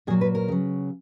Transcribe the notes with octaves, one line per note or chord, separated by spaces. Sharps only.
A#2 F#3 G#4
B4
A#4
C#3 F#3